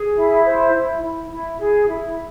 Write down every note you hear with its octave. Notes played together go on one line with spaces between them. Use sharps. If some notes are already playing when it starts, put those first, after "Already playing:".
Already playing: G#4
E4
C5
E4
E4
E4
G#4
E4